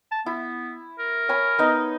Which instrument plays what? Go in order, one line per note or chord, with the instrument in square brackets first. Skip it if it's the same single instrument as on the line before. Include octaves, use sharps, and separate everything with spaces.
[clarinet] A5
[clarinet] B3 [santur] E4
[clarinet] A#4
[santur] C#5 G#5 B5
B3 D#4 D#5